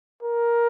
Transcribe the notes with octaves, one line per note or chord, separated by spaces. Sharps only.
A#4